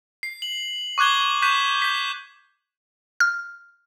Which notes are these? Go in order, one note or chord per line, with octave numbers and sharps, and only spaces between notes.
C7
F#7
C#6 D6 F#6 G#6 G7
C#6 F#6 G6 B6 E7
G6 B6
F6